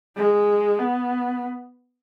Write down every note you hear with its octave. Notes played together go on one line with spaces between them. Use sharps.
G#3
B3